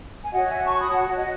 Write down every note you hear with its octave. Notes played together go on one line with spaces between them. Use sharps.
G#5
F#4 C#5 D#5 F#5
E5 G#5
A5 C#6
B5 D#6
F#5 A5
D#5